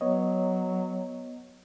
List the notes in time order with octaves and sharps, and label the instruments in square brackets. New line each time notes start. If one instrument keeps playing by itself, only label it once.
[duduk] F#3 [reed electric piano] B3 C#5 D#5